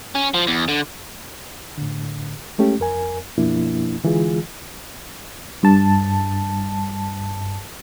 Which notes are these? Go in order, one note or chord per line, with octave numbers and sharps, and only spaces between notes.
C#4
F3
E2
D3
A2 D3
G#3 A3 C#4 G4
F2 A#4 G#5
F#2 B2 F3 A#3 D4 E4
D3 E3 G#3 F4 G#4
G2 A5